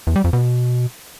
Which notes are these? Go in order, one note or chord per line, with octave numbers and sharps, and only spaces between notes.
E2
G3
F2
B2